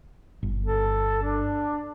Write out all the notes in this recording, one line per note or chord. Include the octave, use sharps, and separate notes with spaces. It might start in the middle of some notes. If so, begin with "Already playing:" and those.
G1
A4
D4